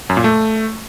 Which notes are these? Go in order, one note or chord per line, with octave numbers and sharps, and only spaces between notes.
F#2
A#2
A3